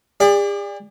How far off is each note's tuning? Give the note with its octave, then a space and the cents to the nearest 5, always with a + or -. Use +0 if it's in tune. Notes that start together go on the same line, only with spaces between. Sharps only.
G#4 -45 D5 +0